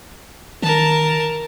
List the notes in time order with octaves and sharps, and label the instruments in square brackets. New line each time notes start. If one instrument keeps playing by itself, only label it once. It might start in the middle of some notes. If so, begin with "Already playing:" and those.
[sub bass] D#3 [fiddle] A#4 A5